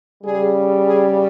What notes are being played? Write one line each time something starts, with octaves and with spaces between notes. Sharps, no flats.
C#3 G3 G#4
G#4